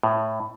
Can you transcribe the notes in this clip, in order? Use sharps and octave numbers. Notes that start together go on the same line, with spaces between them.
A2